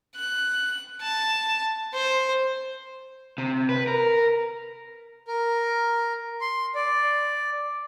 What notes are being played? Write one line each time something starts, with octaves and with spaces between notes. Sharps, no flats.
F#6
A5
C5
C3
B4
A#4
A#4
C6
D5